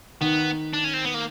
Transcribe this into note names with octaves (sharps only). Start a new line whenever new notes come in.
D#3 B3
D4
C#4
C4
B3
A#3